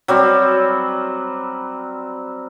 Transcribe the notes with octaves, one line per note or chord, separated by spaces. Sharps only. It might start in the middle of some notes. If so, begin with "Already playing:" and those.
F#3 G3 C4